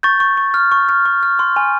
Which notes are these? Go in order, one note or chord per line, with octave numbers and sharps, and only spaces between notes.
C#6 G6 A6
C#6
C#6
F6
C#6
F6
C#6
F6
C6
G#5